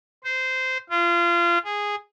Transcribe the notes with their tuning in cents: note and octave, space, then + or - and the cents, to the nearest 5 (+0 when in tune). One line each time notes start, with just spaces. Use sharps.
C5 -15
F4 -25
G#4 -10